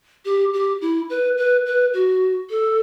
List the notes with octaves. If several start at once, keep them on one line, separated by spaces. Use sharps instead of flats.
G4
G4
E4
B4
B4
B4
F#4
A4